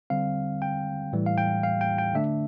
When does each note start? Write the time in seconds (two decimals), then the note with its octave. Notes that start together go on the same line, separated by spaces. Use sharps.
0.10 D3 G3 C4 F5
0.62 G5
1.13 A2 E3 G3
1.26 F5
1.38 G5
1.63 F5
1.81 G5
1.98 G5
2.14 D3 A3 D4 E5